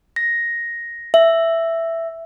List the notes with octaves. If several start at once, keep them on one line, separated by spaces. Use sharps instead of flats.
A#6
E5